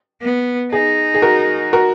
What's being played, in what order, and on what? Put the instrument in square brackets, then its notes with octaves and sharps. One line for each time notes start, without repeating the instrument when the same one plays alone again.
[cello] B3
[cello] D#4 [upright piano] G#4
[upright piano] G#4
F#4 A#4
F#4 A#4